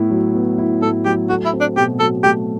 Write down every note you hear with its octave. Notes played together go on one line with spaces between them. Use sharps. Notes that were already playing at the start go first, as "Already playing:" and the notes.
Already playing: A2 B3 E4
F#3
B3
E4
A2 A4
F#3 G4
A3 F#4
E4
C4
D4
B2 G4
F#3 A4
A3 G4